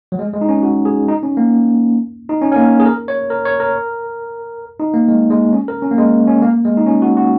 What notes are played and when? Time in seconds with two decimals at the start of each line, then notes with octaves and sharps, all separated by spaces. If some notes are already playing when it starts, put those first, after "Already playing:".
0.12 F#3
0.19 G#3
0.33 G#3
0.41 D#4
0.49 C#4
0.63 F#4
0.85 G#4
1.08 D#4
1.23 C#4
1.37 A#3
2.29 D#4
2.42 C#4
2.52 C#4
2.56 A#3
2.80 G#4
2.86 A#4
3.08 C#5
3.30 A#4
3.45 C#5
3.60 A#4
4.80 D#4
4.94 A#3
5.08 G#3
5.30 G#3
5.53 C#4
5.68 A#4
5.82 C#4
5.91 A#3
5.98 G#3
6.27 C#4
6.42 A#3
6.65 G#3
6.77 D#4
6.86 C#4
7.02 F#4
7.17 F#4